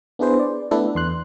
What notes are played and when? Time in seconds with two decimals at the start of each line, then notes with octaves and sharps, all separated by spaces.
0.19 B3 D4 E4 G#4 B4 C5
0.39 D5
0.71 A3 B3 D4 E4 A4 B4
0.95 E2 C6 F#6